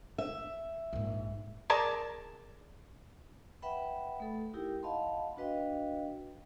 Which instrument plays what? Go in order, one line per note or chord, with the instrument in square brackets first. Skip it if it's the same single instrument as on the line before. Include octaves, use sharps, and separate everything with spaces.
[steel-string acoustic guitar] E5
[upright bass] A#1 G#2
[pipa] G#4 A#4 D5 A5
[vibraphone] B4 E5 F#5 G5 B5
A3 A4
D#4 E4 G4 A#4 G5
D#5 F5 F#5 A5 B5 C6
D4 F#4 B4 D#5 F5 G5